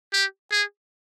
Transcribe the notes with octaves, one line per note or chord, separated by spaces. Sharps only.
G4
G#4